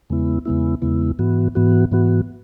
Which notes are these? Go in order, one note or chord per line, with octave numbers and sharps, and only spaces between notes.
E2 C#3 G#3 B3 E4
E2 C#3 G#3 B3 E4
E2 C#3 G#3 B3 E4
G#2 E3 B3 F#4
G#2 E3 B3 F#4
G#2 E3 B3 F#4